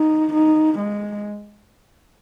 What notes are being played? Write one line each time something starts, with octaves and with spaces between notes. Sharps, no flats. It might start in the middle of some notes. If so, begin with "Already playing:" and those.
Already playing: D#4
D#4
G#3